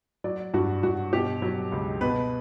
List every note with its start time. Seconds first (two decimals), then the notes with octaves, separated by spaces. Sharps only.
0.24 F#3 D5
0.54 G2 F#4
0.83 G2 F#4
1.13 B2 G4
1.42 F#3
1.72 C#2
2.01 B2 B4